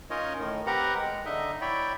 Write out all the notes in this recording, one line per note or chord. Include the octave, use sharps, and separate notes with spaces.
C#4 D#4 F4 A#4 C#5 D#5
A2 D#3
C4 G4 A#4 B4 F#5 A#5
G#3
D3 D#4 D#5 E5
E4 C#5 D5 E5 G5 B5